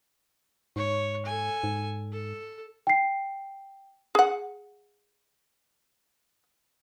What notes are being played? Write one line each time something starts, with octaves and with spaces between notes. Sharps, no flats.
G#2 C#5
A4 G#5
G#2
A4
G5 C7
G#4 F#5